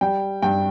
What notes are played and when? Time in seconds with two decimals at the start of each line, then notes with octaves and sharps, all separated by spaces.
0.01 G3 G5
0.42 G2 G5